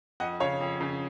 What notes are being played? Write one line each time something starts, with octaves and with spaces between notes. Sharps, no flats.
F2 D#5 F#5
C#3 C#5 F5
F2
C#3